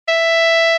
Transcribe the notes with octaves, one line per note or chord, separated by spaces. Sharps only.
E5